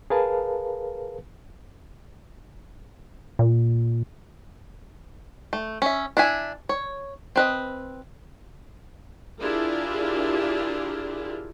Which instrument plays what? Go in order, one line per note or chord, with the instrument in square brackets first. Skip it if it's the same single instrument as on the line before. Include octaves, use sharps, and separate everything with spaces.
[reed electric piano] G#4 A#4 B4 F5 A5
[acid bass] A#2
[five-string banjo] A3
C#4 E5
D4 E4 E5 G#5
C#5
C4 B4 D#5
[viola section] D4 E4 F4 G4 G#4 A#4